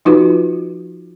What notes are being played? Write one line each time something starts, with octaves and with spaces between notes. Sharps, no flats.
F3 D#4 F4 F#4 B4